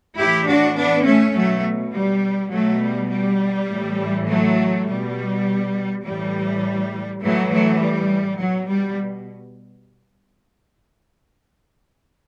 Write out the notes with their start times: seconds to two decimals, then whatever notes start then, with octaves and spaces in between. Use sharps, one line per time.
0.17 A2 E3 E4 G4
0.47 D4 F#4
0.76 B3 D4
1.05 A3 C#4
1.35 B2 F#3 A3
1.93 G3
2.52 B2 F#3 A3
2.82 G3
3.10 G3
3.69 A2 E3
4.28 F#3 A3
4.86 B2 G3
6.04 A2 E3 G3
7.21 A2 E3 F#3 A3
7.50 F#3 A3
7.80 G3
8.38 B2 F#3
8.68 G3